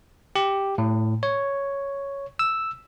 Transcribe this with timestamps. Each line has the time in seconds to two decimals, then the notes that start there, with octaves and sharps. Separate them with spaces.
0.36 G4
0.78 A2
1.23 C#5
2.39 E6